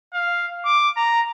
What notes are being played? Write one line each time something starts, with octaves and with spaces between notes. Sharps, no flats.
F5
D6
A#5